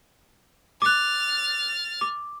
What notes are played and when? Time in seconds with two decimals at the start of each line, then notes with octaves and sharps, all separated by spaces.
0.82 D6 F6 F#6 A6
2.01 D6